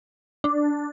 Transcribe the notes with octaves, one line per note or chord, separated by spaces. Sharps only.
D4